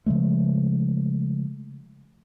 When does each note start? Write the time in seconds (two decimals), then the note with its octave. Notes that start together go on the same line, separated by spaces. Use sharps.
0.06 C#3 F3 G#3 A3